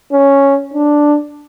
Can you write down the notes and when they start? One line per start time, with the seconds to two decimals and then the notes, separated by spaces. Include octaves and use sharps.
0.12 C#4
0.74 D4